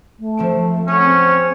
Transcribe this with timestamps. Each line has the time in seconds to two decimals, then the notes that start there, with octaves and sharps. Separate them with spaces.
0.20 A3
0.37 F3 C4 D7
0.88 C#4 G#4 F#5
1.02 C4